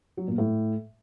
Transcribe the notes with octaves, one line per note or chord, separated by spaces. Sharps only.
F#3
A#2
A2